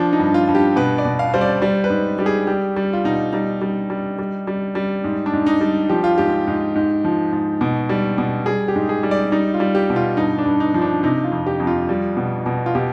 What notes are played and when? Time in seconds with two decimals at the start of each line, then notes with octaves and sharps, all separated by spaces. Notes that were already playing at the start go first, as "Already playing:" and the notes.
Already playing: F3 D4
0.13 D#4
0.19 G2
0.34 F4
0.48 G2
0.55 G4
0.76 B2 B4
0.98 D5
1.05 B2
1.19 F5
1.34 G3 C5
1.41 D5
1.62 G3 C5
1.84 B4
1.90 G#2
2.19 G3 G4
2.26 G#4
2.47 G3 G4
2.76 G3
2.93 F4
3.04 B2 D#4
3.33 G3 D#4
3.61 G3
3.90 G3
4.19 G3
4.47 G3
4.75 G3
5.04 G#2
5.26 D4
5.33 G#2
5.46 D#4
5.61 G3
5.89 F3 G4
6.04 F4
6.18 G#2 G4
6.47 G#2
6.75 G#2
7.05 F3
7.32 G#2
7.61 B2
7.89 G3
8.18 B2
8.46 G3 G#4
8.68 G4
8.76 G#2
8.89 G#4
9.03 G3
9.11 D5
9.32 G3 D#4
9.54 F4
9.60 G3
9.75 G4
9.90 B2
9.96 F4
10.17 G2 D#4
10.38 D4
10.46 G2
10.60 D#4
10.74 F3
10.82 D4
11.03 C3 D#4
11.24 F4
11.32 F2
11.47 G4
11.60 F2
11.67 F4
11.89 G3
12.17 B2
12.46 B2
12.66 F4
12.75 B2 G4